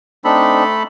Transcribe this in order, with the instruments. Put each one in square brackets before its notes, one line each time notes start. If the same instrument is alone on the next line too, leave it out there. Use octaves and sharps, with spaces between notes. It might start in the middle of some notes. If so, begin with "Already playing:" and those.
[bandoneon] A3 A4 B5 [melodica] C4 D4 D#4